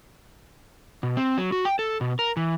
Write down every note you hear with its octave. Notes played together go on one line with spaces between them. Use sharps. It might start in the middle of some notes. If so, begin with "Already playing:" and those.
B2
C4
F#3
F#4
G5
A4
B2
A#4
E3